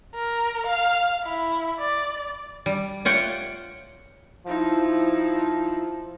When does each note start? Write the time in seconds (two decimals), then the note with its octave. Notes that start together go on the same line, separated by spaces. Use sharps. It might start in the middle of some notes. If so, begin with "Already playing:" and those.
0.15 A#4
0.66 F5
1.24 E4
1.79 D5
2.66 G3
3.05 F4 C#5 F#5 G5
4.46 F3 D#4 E4